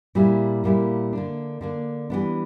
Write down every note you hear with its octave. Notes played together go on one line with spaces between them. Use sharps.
A#2 G3 A#3 E4
A#2 G3 A#3 E4
D3 A#3 D4
D3 A#3 D4
E3 G3 B3 D4